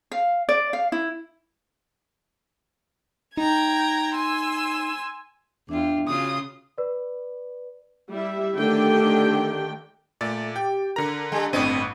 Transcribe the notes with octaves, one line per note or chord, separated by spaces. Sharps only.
F5
D5
F5
E4
D#4 G5 A#5 G#6
G#5 C6 E6
E2 D4 F4 E5 G5
C#3 F4 F#4 D#6
B4 D5
G3 E4 E5
D3 D#3 A3 D4 G4 G5
A#2 A3 D5 A6
G4 G5
D3 A#4 A#5
G3 A4
G1 A2 C4 D4 B4 D#5